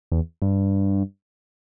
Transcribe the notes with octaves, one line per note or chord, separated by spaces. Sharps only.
E2
G2